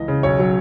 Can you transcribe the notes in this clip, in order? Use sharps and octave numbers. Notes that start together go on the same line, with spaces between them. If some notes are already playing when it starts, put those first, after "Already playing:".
Already playing: C#2 E3 D#5
C#3
B1 C#5
F#3